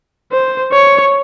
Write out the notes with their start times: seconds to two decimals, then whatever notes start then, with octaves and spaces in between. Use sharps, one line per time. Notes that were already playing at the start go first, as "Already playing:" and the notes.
0.32 C5
0.72 C#5